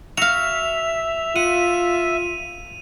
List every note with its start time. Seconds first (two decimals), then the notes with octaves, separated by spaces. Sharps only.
0.17 F#4 E5 F5 F7
1.36 F4 F#5 D#7